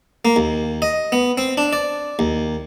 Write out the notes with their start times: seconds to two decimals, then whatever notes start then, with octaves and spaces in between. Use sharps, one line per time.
0.25 A#3
0.36 D#2
0.82 D#5
1.12 B3
1.38 C4
1.57 D4
1.73 D5
2.19 D#2